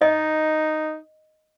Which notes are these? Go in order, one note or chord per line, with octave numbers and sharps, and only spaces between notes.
D#4 D#5